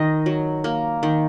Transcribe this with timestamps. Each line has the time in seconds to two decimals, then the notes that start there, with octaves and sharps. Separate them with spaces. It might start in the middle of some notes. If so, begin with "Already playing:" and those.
Already playing: D#3 D#5
0.26 F#3
0.64 A#3
1.03 D#3